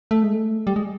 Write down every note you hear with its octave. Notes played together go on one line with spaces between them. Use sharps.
A3
G#3
A3
G3
G#3